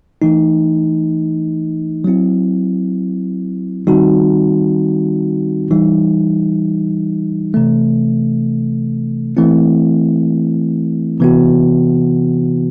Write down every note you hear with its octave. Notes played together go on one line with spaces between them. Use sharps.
E3 A3 D#4
F#3 C4 E4
D#3 G3 C4 D#4 F#4
E3 G3 D#4
C3 E3 A3
E3 A3 C4 E4
C3 E3 B3 F#4